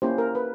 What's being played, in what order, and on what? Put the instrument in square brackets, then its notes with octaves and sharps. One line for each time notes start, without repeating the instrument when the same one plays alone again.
[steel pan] A#3 C#4 E4 G4 C5
A#4
B4